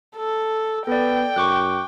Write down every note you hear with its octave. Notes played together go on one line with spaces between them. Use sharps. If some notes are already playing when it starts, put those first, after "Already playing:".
A4
B3 A4 D5 G5
F#2 C#6 D6 F#6